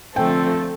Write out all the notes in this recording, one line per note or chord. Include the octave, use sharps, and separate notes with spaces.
D3 F3 A3 C4 A4 G5